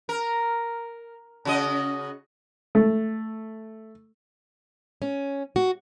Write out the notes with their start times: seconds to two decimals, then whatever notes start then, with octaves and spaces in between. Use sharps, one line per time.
0.09 A#4
1.45 C#3 F#4 D#5
2.75 A3
5.02 C#4
5.56 F#4